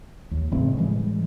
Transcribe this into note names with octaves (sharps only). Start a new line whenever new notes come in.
D#2
E1 A2 C#3 C4
A2 E3 G3 G#3